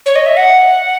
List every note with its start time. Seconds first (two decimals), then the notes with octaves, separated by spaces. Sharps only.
0.06 C#5
0.16 D#5
0.26 E5
0.37 F#5